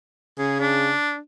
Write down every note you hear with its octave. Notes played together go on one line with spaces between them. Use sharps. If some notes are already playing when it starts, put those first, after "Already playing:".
C#3 G#4
D4